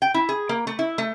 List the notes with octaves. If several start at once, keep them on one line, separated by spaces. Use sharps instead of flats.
G5
E4
G#4
A#3
A3
E4
A3